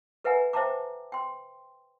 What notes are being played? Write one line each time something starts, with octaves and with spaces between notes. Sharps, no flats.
A4 B4 E5 F#5 G#5 A#5
C5 E5 G5 A5 A#5 D6
G5 C6